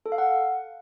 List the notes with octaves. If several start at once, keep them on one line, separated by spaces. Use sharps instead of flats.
A4
F5
F#5